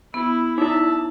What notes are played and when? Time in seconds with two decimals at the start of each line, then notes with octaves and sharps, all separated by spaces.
0.14 B3 E4
0.58 D#4 E4 E5 A5